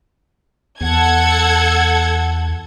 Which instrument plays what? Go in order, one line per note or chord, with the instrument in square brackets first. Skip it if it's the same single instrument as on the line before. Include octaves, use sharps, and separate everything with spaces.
[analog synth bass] E2 [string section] A4 F#5 G#6